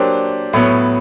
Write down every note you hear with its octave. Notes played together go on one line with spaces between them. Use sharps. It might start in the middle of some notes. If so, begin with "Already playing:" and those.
Already playing: F#3 A#3 D4 G4 C5
A2 F#3 B3